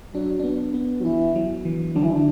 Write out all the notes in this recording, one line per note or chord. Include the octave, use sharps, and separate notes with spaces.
F#3 D4
D4
B3
B3
F#3
E3 E4
F#3
E3
D3 F#3
E3
D3